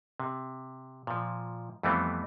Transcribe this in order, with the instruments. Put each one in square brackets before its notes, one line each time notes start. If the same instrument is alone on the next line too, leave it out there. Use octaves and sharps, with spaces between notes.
[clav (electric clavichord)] C3
A#2 F3
F2 E3 G3 A3 B3 C4